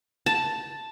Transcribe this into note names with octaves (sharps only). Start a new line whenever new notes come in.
A5